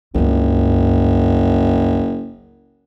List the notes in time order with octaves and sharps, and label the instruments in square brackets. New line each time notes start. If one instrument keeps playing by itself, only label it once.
[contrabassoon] F#1 [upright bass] C#2 G2